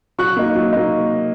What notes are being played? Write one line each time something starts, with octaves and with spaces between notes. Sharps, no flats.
F#3 C#6 F#6
A#3 D#4
F#3
A#3 D#4